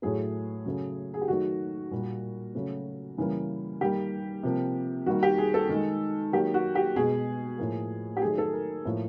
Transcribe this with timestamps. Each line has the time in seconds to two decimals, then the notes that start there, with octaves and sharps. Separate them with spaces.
0.02 A2 F#3 A3 G#4
0.66 C#3 F#3 A3
1.14 G#4
1.21 G4
1.28 D#3 F#3 A3 F#4
1.91 A#2 G3 A#3
2.55 C#3 F#3 A3
3.17 C#3 E3 G3 A#3
3.81 D#3 G3 A#3 G4
4.43 C3 F3 A#3
5.06 D#3 G3 A#3 F#4
5.23 G4
5.38 G#4
5.54 A4
5.69 D#3
5.74 G#3
6.32 D#3 F#3 A#3 G4
6.54 F#4
6.75 G4
6.96 B2 G#3 G#4
7.58 A2 F3 A#3
8.17 G4
8.22 D#3 F#3 A3 G#4
8.38 A4
8.53 A#4
8.85 A2 F3 A#3